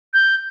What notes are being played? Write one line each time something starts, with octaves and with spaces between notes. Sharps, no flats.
G6